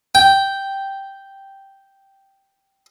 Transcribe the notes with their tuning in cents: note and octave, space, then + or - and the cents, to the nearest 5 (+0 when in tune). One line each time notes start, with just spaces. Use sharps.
G5 -5